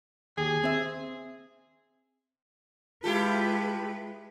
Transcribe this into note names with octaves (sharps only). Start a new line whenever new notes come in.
D#2 G#4
C4 E5
G#3 E4 F4 G4 A4 B4